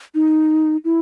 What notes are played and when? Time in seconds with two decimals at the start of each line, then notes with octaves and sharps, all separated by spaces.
0.15 D#4
0.84 E4